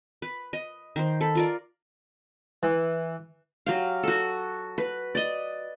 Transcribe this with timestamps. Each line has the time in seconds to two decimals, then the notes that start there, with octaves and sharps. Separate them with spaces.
0.22 B4
0.53 D#5
0.96 D#3 C5
1.21 A4 B5
1.35 F4 A#4 D5
2.63 E3
3.66 F#3 G4 F5
4.03 F#4 A4
4.78 B4
5.15 D5 D#5